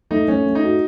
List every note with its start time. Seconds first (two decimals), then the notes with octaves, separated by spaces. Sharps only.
0.11 A3 D#4
0.28 A3 C#4
0.46 A3
0.55 D#4
0.63 F#4